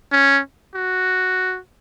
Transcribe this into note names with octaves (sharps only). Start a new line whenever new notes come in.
C#4
F#4